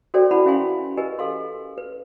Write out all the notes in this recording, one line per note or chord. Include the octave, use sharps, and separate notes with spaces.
F#4 A4 C5 D5 E5 G5
E4 B4 C5 F#5 A5 B5
C#4 E5 F5 G#5 C6
G4 A#4 B4 D#5 G#5
A4 F5 C6
B4